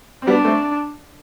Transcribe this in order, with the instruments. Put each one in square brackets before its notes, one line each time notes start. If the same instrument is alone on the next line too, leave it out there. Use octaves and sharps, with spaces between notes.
[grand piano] C4
[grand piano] G3 B3 [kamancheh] D4
[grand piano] A3 C4